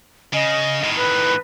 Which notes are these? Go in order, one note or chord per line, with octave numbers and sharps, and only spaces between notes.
C#3 D#5
A2 D#3
B4